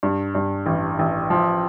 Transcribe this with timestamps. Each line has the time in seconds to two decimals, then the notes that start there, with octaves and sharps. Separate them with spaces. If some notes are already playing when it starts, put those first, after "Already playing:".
0.03 G2
0.35 G2
0.66 A1
0.99 A1
1.30 F3